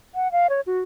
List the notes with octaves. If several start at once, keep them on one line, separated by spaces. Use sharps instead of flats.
F#5
F5
C#5
F#4